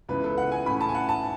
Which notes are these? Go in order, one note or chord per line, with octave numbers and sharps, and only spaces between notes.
C#2 C#3 E3 B3 B4
A4
F#5
G#5
A2 E3 A3 C#4 B5
A5
G#5
F#5
A5